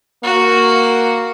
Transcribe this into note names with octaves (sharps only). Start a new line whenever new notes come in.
A#3 F#4